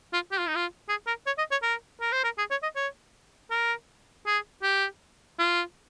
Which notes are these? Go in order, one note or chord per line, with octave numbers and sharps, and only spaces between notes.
F4
G4
F4
D#4
F4
G#4
A#4
C#5
D#5
C#5
A#4
A#4
C5
A#4
G#4
C#5
D#5
C#5
A#4
G#4
G4
F4